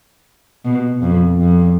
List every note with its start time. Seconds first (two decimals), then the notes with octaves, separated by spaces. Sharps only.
0.65 B2
1.02 F2
1.40 F2